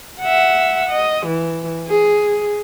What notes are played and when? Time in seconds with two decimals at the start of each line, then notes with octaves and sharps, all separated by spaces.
0.20 E5 F#5
0.90 D#5
1.26 E3
1.87 G#4